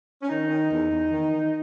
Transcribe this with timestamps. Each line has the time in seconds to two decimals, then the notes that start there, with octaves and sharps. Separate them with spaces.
0.23 C#4
0.30 D#3 D#4
0.50 D#3
0.71 E2
0.91 E2
1.11 D#3
1.32 D#3